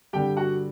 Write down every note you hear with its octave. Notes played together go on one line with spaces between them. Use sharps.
G2 D3 G3 G4 G5
F#4 F#5